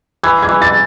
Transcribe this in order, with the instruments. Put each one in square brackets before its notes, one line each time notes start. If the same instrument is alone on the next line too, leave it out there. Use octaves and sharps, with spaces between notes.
[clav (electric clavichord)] E3 [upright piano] G#6
[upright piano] G#6
[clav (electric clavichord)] E3
[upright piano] A6